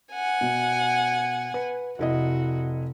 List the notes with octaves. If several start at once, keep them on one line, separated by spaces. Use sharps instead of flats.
F#5 G#5
B2
B4
F1 E4 F#4 D#5